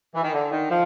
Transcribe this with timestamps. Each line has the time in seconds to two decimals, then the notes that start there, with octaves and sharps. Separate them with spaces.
0.13 E3
0.22 D#3
0.32 D3
0.51 D#3
0.69 F3